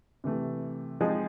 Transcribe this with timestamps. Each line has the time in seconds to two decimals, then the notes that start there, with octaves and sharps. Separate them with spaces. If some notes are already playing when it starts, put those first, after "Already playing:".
0.24 C3 E3 A3
1.01 F3 G#3 C4 D#4 G#4